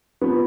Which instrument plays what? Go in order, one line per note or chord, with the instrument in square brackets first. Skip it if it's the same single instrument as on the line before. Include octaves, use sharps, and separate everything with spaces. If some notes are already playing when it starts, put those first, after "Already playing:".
[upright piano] F3 B3